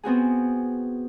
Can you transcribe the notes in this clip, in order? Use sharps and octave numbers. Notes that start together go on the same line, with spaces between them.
B3 C4 F#4 G#4